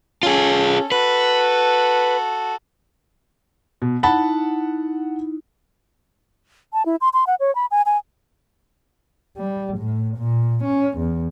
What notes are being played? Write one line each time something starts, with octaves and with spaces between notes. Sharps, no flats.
C#4 F4 G#4 A4
F#4 A4 B4
B2
D#4 E4 F#5 A5 B5
A5
E4
C6
C6
F#5
C#5
B5
G#5
G#5
G3
A2
A#2
C#4
E2